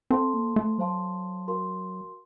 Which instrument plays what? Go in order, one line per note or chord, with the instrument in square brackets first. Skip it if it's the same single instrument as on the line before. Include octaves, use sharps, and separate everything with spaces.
[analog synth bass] C4 [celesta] A4 C5 F5 A5 C6
[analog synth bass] A#3
A3
[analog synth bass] F#3 [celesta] A4 C5 F5 A5 C6
[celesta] F#4 A#4 F5 C6